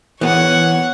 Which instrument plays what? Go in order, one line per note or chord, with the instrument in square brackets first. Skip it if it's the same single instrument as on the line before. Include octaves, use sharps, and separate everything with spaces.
[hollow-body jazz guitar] E3 B3 [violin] C#5 F#5